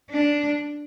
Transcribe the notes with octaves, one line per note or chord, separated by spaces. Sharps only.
D4